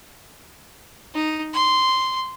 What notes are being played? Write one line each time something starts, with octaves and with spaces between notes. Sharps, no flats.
D#4
C6